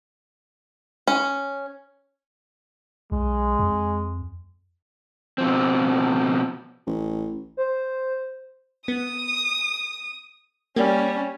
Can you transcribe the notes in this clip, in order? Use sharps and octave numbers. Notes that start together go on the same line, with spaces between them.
C#4
B1 G#3
F2
B2 F3 C4
A1
C5
B3 D#6
G3 A#3 C#4